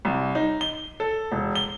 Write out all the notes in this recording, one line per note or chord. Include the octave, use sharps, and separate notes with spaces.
C2
D#4
G7
A4
E1
G7